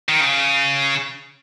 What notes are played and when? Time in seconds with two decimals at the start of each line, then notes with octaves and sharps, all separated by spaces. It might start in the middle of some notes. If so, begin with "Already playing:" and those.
0.09 D#3
0.20 C#3